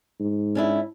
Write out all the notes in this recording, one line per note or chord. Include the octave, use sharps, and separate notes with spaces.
G#2
C#4 D4 E4